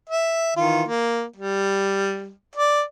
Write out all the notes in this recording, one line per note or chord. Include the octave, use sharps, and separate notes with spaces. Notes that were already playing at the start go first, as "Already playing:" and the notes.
E5
D#3 E3 F4
A#3
G3
D5